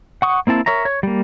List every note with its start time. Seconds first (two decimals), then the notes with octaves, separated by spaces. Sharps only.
0.22 F#5 C#6 D#6
0.47 A#3 C4 E4 A5
0.66 A#4 C#5 E5 A#5
0.85 C#5
1.03 G3 A#3